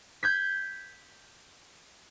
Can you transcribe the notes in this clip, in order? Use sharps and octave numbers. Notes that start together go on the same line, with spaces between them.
G6 G#6 B6